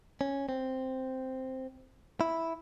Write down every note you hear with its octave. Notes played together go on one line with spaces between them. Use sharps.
C#4
C4
E4